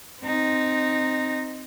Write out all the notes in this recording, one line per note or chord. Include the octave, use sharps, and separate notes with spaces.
C4 D#4